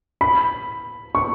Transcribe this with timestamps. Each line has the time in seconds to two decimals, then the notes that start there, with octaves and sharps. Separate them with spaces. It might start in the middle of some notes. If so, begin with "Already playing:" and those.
0.21 B5
1.15 C#6